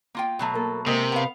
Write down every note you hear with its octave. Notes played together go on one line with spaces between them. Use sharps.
A#3 F4 G5
B2 F#3 A3
A#3 A4
C3 G#3 A#3 C4
B3 F5